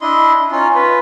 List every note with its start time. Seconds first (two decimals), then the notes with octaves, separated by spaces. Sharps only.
0.01 D4 E4 D#5 C6
0.51 C#4 D#4 F4
0.75 F4 B4